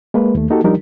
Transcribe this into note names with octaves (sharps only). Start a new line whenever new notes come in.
G#3 A#3 B4
D#2 A3
A#3 D#4 F#4 G4 A4
F3 G3 D4 D#4 G4 A#4